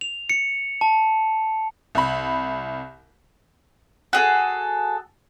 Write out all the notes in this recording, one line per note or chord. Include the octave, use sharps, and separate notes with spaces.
F7
C#7
A5
C2 B5
F#4 G#4 A4